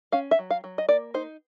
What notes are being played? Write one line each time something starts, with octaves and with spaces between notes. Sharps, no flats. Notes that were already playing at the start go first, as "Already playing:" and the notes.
C#4 F5
E5
F#3
F5
F#3
D#5
A#3 D5
D#4 C5